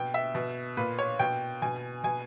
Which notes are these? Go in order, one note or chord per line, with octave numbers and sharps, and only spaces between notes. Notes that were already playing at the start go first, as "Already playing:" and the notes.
Already playing: B2 G5
E5
B2
A#2 B4
C#5
B2 G5
B2 G#5
B2 G#5